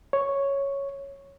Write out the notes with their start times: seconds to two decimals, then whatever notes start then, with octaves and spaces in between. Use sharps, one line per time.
0.13 C#5